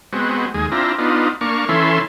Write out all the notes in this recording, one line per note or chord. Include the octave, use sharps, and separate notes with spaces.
G#3 B3 C4 F#4
D#2 G#3 G#4
C4 D4 E4 F4 A#5
B3 D4 D#4 F4
A#3 D4 C#6 F6
E3 C#4 E4 A4 C6